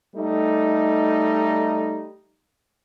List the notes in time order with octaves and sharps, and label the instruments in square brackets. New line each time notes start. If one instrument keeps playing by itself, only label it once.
[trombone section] G3 A3 D#4